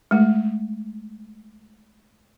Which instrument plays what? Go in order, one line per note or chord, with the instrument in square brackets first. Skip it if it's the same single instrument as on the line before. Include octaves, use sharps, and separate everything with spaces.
[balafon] G#3 A3